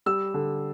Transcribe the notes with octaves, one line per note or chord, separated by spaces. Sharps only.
G3 E6
D3